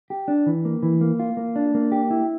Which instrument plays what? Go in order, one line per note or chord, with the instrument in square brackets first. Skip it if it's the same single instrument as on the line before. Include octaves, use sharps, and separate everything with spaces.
[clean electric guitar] G4
D4
E3
A#3
E3
A#3
F4
A#3
D4
A#3
G4
E4